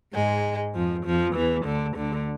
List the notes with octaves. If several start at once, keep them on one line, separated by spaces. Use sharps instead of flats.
G#2 G#3
F2 F3
F2 F3
E2 E3
D2 D3
D2 D3